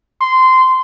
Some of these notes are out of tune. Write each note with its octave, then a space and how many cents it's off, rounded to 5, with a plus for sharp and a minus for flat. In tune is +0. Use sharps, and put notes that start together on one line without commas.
C6 -15